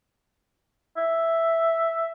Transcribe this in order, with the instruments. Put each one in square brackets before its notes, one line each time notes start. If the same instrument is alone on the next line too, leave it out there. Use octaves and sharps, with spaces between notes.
[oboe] E5